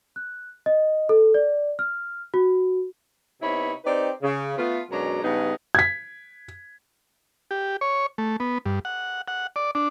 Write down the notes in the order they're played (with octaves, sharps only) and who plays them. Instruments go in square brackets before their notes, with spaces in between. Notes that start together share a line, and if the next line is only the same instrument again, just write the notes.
[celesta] F#6
D#5
A4
D5
F6
F#4
[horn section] C3 B3 D#4 E4 C#5 B5
C4 D#4 G4 B4 D5
C#3
A3 B3 F4
F#2 B2 F#3 G#3 D4 A#5
G2 C#3 G#3 B3 D#4
[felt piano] G#6 B6
[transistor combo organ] G4
C#5
A3
B3
G2
F#5
F#5
D5
D4